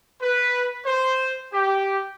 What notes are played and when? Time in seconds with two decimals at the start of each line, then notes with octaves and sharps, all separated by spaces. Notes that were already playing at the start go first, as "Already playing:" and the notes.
0.22 B4
0.86 C5
1.53 G4